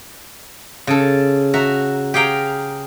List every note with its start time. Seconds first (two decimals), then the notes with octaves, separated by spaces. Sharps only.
0.87 C#3 A4
1.54 F#4 E5 A#5
2.14 G4 G#4 F5 G5 A#5